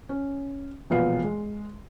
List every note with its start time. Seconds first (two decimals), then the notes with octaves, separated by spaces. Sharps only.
0.09 C#4
0.90 E1 A#2 F3 B3 F5 C7
1.24 G#3